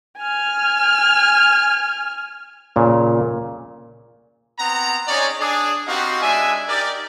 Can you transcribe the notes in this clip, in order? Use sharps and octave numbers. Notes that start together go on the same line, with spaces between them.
G#5 F6
A#2 C#3
B3 C4 F#5 A#5
C4 C#4 D#4 G#4 C#5 D5
D4 G#4 D5
B3 C4 D#4 F#4 G4 F5
G#3 D4 D5 E5 G#5
D#4 G4 A#4 D5